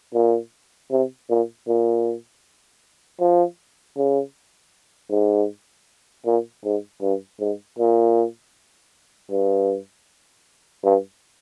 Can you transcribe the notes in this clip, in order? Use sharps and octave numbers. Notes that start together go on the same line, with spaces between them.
A#2
C3
A#2
A#2
F3
C#3
G#2
A#2
G#2
G2
G#2
A#2
G2
G2